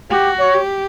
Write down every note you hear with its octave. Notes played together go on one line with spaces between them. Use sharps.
F#4 G4
C#5
G4